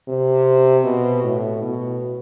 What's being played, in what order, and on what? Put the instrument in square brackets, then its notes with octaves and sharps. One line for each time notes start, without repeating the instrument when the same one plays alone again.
[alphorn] C3
B2
A2
B2